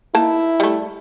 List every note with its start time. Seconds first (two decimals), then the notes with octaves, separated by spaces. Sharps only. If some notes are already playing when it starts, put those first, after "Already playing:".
0.15 A#3 D#4 E4 A5
0.60 G3 A3